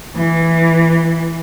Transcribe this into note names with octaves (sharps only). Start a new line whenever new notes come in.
E3